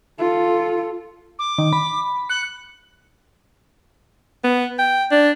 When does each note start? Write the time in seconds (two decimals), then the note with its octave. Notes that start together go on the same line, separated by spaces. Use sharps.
0.18 F4 A4
1.39 D6
1.58 D#3
1.73 B5
2.29 F#6 C#7
4.44 B3
4.79 G5
5.11 D4